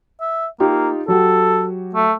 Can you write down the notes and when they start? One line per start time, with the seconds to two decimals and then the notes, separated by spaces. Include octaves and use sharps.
0.21 E5
0.60 A#3 D#4 F4 G4
1.08 F#3 F#4 G4 A4
1.95 A3